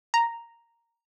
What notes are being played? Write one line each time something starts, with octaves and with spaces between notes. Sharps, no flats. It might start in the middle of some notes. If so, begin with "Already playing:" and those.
A#5